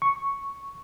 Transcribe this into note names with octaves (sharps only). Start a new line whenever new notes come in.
C#6